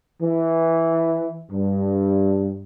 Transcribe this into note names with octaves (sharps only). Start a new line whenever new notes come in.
E3
G2